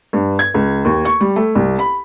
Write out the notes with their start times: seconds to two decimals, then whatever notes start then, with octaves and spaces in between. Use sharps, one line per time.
0.13 G2
0.39 G#6
0.54 C#2
0.85 D#2
1.05 C#6
1.21 G3
1.36 A3
1.55 C2
1.79 B5